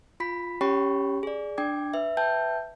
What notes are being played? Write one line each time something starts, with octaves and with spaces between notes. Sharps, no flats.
F4 B5 B6
C#4 G4 C#5 G5 B5 C#6
G#4 D5
D4 G5 D6 G#6
B4 E5
B4 E5 G5 A5 G6